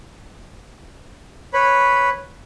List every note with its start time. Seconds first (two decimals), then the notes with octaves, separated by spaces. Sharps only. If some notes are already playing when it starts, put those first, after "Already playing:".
1.53 B4 C#5 B5